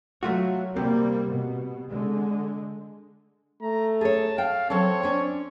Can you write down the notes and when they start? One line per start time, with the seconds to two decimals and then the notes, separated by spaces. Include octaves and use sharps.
0.23 F#3 A3 F4 F#4
0.77 C3 G3 A#3 C4
1.28 B2
1.89 D3 G#3
3.62 A3 A#5
4.01 G#4 C#5 A5
4.38 F5 G5
4.70 F#3 C4 A4 C#5 A5
5.03 C#4 D4